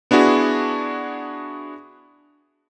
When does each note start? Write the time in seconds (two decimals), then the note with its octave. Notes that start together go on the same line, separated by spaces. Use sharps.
0.11 B3 D4 E4 F#4 G#4